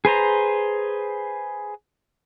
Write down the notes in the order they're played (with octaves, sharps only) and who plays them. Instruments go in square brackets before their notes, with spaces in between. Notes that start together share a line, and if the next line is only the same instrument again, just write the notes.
[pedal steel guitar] G#4 B4 C5 A#5